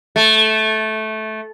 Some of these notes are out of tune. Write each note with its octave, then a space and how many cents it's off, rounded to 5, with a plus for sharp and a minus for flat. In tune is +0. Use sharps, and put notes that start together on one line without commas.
A3 -15